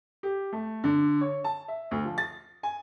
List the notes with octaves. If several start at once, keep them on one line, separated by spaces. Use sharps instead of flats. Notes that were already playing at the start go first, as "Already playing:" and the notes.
G4
A3
D3
C#5
A5
E5
D2
F3
A6
G#5